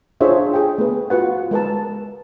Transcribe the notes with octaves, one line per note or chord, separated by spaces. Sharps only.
D4 F4 G#4 C5 C#5 E5
G#4 G5
A3 B3 B4
F4 F#4 B4 F#5
G#3 A#4 B4 A5